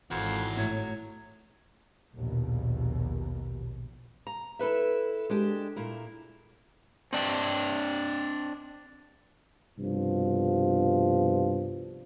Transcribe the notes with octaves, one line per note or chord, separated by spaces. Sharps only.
G#1 F2 E3 F#4
A2 F#3
A#1 D#2 B2
A#5
E4 A4 B4 E5
G#3 D4 G4
A#2 E4 A#4
C4 D4 G5
C2 G2 B2 F3